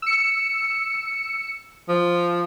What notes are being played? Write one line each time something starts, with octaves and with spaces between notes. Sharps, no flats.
E6 C#7
F3